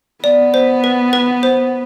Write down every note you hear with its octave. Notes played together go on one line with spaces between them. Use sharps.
B3 D5
C5
B4
B4
C5